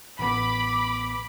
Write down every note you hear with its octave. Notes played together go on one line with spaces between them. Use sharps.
A1 B3 B5 D6